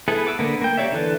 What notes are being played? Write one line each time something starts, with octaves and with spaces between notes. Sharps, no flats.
B3 E4 G#4 A4 B4
D6 E6
D3 A#3 B3
A#3 G5
A#3 G4 C#5 D5 E5
D3 E3 A4 B4 D5